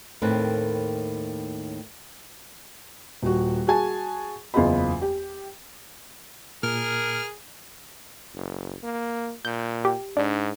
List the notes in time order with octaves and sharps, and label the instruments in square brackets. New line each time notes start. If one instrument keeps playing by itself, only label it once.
[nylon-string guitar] D#2 A2 D#3 C4 B4
[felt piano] D#1 F#4
F#4 G#4 G#5 A5
F#1 E2 F4 G#4 D#5 B5
G4
[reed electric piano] A#2 [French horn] G#4 [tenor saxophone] A#4 [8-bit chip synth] F6
[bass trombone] F#1
A#3
[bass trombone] A#2 [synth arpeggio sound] G6
[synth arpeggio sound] G4
[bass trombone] G#2 [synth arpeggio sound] D4